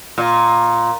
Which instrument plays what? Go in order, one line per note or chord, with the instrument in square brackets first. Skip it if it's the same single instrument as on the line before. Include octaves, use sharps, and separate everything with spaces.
[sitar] A#2